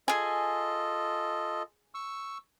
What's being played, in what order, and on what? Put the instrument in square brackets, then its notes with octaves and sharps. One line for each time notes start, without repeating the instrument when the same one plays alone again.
[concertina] F4 A4 D#5 [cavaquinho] G#4 G#5
[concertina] C#6 E6